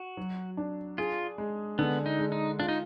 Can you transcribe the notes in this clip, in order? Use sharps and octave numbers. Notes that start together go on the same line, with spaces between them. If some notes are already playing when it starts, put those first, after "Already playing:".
Already playing: F#4
F#3
D4
F4 G#4
G#3
D3 B3
D#4
G#3
D#4
D4 F4
D#4